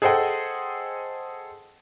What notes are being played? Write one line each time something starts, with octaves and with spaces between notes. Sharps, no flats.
G#4 A4 C5 D#5 F#5 G5